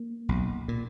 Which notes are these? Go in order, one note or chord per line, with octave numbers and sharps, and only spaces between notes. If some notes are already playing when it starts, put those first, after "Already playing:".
Already playing: A#3
B1
A#2